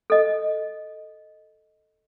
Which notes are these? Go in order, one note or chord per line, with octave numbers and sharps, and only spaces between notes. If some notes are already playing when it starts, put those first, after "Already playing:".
A4 D#5